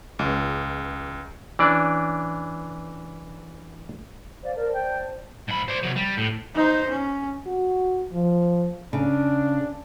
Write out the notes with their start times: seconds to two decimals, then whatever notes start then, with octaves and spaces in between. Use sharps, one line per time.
0.19 C#2
1.59 E3 C#4 D4 D5
4.44 C5 D5 F5
4.56 A#4 C5 D5 A5
4.74 G5
5.48 G#2 B5
5.68 C5 D5
5.83 C3 F#3
5.96 G3
6.17 A2
6.54 D#4 C5
6.90 C#4
7.46 F#4
8.12 F3
8.93 C#3 D4